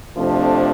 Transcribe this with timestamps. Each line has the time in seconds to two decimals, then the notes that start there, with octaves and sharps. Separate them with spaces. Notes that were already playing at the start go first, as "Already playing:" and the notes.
0.17 F2 C3 F3 A3 D4